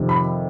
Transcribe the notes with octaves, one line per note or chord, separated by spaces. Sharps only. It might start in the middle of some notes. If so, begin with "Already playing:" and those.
Already playing: F2 C3 D#3
B5